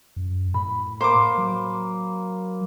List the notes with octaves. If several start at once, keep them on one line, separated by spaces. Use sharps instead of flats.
F#2
A2 B5
A#3 C5 B5 D6
F#3